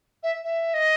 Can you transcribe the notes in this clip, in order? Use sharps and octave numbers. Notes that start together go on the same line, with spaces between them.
E5
E5
D#5